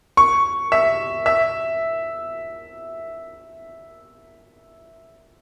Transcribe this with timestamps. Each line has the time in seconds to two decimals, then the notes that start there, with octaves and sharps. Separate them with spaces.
0.17 C#6
0.72 E5
1.26 E5